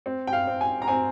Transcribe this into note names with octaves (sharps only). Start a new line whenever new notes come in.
C4
G5
F5
C4
G#5
A#5
C4 G#5